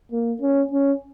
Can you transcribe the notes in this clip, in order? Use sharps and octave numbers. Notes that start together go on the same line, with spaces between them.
A#3
C#4
C#4